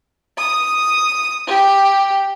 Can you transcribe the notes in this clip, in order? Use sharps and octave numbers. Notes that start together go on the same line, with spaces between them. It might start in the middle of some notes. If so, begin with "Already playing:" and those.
D#6
G4